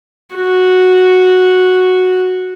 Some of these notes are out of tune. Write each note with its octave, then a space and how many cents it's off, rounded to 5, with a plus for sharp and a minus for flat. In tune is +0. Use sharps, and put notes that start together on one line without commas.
F#4 -5